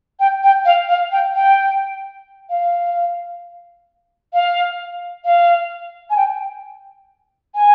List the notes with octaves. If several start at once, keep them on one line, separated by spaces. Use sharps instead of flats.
G5
G5
F5
F5
G5
G5
F5
F5
F5
G#5
G5
G#5